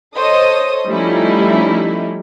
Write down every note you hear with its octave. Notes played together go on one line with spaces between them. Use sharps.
A4 C5 C#5 D#5 D#6
F3 G3 A3 C#4 D#4 E4